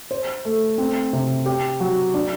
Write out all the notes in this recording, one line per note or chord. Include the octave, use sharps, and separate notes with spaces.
C5
A3
C4
C3
G4
F#3
D4